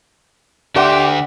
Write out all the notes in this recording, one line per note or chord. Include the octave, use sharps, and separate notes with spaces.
D3 G4 D5 E5 F#5 C6